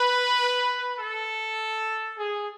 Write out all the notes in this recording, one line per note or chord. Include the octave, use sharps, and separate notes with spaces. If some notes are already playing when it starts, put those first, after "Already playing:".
Already playing: B4
A4
G#4